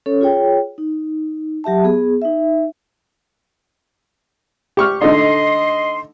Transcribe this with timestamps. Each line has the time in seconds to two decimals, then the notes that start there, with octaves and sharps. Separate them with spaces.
0.06 C#4 A4 C#5
0.21 F4 G#4 C#5 G5
0.78 D#4
1.64 F#3 G4 E5 A5
1.84 B3 G#4
2.22 D#4 E5
4.77 G4 C#6 F6
5.02 D3 A3 D#4 D#5 C6